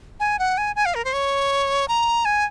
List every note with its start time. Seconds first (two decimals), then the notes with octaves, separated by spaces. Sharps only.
0.20 G#5
0.39 F#5
0.58 G#5
0.76 G#5
0.85 F5
0.95 A#4
1.04 C5
1.13 C#5
1.88 A#5
2.25 G#5